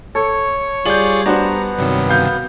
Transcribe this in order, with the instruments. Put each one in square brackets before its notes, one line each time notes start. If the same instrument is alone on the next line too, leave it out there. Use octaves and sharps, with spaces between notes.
[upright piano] A4 [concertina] C#5
[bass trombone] G3 [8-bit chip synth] F4 G#4 D5 [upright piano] G6 F#7
[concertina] B3 [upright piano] D4 F#4 C5 [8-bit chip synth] A#5
[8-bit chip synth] G2 C3 D#3 [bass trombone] F#3
[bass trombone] B2 [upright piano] F5 G6